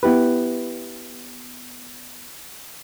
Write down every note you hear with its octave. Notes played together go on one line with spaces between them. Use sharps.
B3 E4 G4 B4